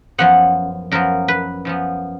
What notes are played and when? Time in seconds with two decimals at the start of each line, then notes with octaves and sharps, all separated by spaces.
0.18 F#2 F3 B3 F#5
0.91 F#2 F3 B3 A#4
1.28 B4
1.65 F#2 F3 B3